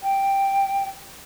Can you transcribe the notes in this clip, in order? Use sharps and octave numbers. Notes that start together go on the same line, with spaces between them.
G5